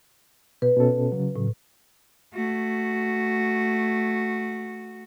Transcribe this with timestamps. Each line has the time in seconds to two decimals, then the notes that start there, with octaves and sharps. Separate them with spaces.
0.62 B2 B4
0.77 B2 C#4 A4
1.12 C#3 F#3
1.36 A2
2.33 A3 F#4